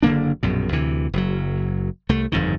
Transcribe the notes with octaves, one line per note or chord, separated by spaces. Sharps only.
F#1 D3 A#3 D4
A#1 F#2 B2
D2 C3 E3
F#1 F#3
C2 A3
G1 F2 G#2 D#3